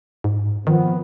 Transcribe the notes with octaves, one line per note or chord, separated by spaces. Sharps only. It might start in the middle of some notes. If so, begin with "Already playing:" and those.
G#2
D#3 F3 B3 C4